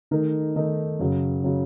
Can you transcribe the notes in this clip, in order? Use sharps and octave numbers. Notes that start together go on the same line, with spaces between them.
D#3 A3 D#4 A#4 D#5
D#3 A3 D#4 A#4 D#5
F#2 C#3 F#3
C#3 F#3